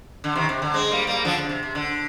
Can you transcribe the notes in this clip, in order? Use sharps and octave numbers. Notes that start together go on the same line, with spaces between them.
D3
C3 D#3
C3
D3
G#3 C4
G3 A#3
G3 A#3
D3 F3
D3
C3
C3
D3